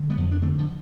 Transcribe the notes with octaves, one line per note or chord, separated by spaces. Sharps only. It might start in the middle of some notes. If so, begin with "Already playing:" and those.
Already playing: D3
G3 B3
F2
D4
D3 A3 C4
D3 F3